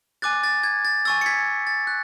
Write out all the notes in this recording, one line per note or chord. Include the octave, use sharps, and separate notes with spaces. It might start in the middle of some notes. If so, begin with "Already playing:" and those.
G#5 D6 F#6 A6
A6
G#6
A6
G#5 C#6 E6 A6
C#7
G#6 B6
A6
F#6